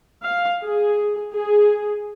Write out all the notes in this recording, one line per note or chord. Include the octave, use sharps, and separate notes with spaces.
F5
G#4
G#4